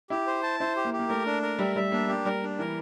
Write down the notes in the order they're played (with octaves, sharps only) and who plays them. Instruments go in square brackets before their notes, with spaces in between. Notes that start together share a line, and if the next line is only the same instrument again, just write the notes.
[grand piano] E4 [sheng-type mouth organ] G4
[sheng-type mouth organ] C5
A5
[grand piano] E4 [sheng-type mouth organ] C5
[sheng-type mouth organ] G4
[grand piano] A#3
[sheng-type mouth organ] G4
[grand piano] A#3
[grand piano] A3 [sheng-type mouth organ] A#4
[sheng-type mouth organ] D4
A#4
[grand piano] G3 [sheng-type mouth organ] E5
[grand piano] G3 [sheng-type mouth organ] E5
[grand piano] A#3 [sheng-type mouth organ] D4
[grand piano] A#3 [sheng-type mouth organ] G4
[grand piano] G3 [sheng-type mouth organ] A#4
[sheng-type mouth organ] D4
[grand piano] E3 [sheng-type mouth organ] A#4